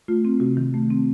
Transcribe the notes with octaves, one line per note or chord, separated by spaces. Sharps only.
A3 F4
C4
C3 F#4
D#3
A3
C4